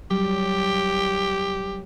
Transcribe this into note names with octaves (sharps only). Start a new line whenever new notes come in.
F#3 G3 G4